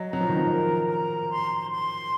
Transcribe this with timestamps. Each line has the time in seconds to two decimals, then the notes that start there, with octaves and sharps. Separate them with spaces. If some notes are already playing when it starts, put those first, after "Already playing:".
Already playing: F#3 D#5
0.12 F#3 A#5
0.21 F3
0.29 D#3
0.37 F3
0.52 A#4
0.91 A#5
1.30 C6
1.70 C6